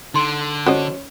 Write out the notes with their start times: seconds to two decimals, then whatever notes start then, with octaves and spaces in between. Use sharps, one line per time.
0.14 D3 D#4 C6
0.66 C#4 F#4 C5 D#5